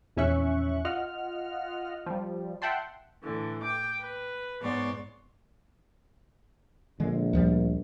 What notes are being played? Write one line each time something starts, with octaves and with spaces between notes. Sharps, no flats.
A#1 E2 C#4 E5 C#6 F#6
F4 D#5 F#5 F6
F3 G3
E5 F#5 G5 A5 C6
A2 D3 E3
G5 D6
B4
G#2 B3 C#5 D5 C6
A#1 D3 G#3
D2 F3 G3